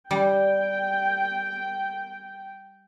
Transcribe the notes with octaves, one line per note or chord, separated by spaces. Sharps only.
G3 G5